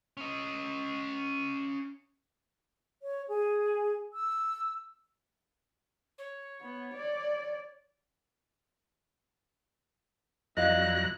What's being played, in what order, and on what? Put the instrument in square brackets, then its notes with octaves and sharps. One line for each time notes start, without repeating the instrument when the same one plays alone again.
[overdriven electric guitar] C#4 D#5
[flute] C#5
G#4
E6
[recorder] C#5
[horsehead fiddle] B3
D5
[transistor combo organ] F2 F#3 A#5 [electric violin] E4 F#6 [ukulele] D5 D#5 F5